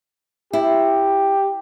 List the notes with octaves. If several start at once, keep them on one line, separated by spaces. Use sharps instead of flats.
E4 G4